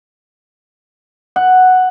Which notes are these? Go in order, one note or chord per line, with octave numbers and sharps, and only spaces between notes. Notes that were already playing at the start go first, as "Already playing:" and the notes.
F#5